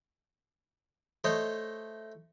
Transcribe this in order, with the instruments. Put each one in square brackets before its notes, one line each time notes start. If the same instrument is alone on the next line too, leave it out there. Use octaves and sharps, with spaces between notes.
[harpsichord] A3 C5 C#5 D#5